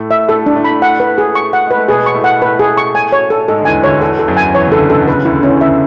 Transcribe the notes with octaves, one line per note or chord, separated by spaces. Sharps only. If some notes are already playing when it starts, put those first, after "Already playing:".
Already playing: A2 A3
E5
A2 A3 A4
D4
A2 A3
B5
F#5
B4
G#4
C#6
F#5
G#3 B4
A3
B2 B3 G#4
C#6
A2 A3
F#5
A2 A3 B4
G#4
C#6
G#5
C#5
A4
G#2 G#3 A4
D3
E2 E3 G#5
D2 D3 C#5
E2 E3 A4
A4
F#2 F#3
G#5
E2 E3 C#5
C#3
D2 D3 A4
B2 A4
C#3 B4
E3
D2 D3 E4
E2 E3 C#4
D2 D3 E5